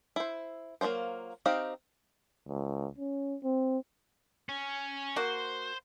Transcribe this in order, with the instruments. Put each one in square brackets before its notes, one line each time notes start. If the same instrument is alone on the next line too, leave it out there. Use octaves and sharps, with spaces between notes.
[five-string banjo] E4 C5
F#3 A#3 D4 F4 C5
C4 D#4 G4 F5
[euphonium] C#2
C#4
C4
[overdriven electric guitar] C#4
[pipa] A#3 F#4 [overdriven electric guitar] C5